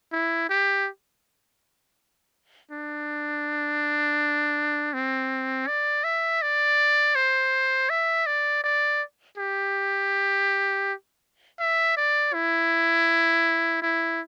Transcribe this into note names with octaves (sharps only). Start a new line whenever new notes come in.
E4
G4
D4
C4
D5
E5
D5
C5
E5
D5
D5
G4
E5
D5
E4
E4